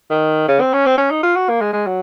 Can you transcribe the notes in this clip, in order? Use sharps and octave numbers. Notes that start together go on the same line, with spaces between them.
D#3
C#3
C4
C#4
C4
C#4
D#4
F4
F#4
A#3
G#3
G#3
F#3